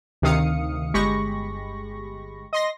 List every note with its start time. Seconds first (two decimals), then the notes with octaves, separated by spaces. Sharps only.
0.22 D2 C3 D#3 F5 D#6 C#7
0.94 G1 G#3 G4 B5 C#6 A#6
2.53 D#5 C6 A#6